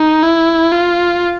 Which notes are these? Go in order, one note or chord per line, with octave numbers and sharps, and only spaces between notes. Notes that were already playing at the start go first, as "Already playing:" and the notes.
Already playing: D#4
E4
F4